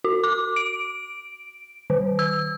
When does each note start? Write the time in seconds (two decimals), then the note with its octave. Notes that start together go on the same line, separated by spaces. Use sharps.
0.04 F#4
0.24 D6
0.56 D7
1.90 D#3
2.19 E6